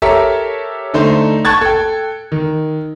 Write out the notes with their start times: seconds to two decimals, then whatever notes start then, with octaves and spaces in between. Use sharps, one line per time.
0.02 G4 A4 A#4 C#5 E5
0.94 D3 A3 D#4 C5
1.45 A5 C#6 F#6 G#6 A6
1.61 A4 G5
2.32 D#3